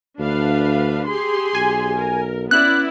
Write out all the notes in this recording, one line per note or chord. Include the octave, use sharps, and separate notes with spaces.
D2 D4 B4 F5
G4 G#4 C6
B1 G#5
A#4
B3 C#4 E4 D5 F#6